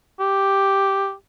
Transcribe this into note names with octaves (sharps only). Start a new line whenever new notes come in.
G4